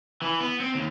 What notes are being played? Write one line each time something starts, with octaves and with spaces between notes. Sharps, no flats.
E3
B3
C4
D#2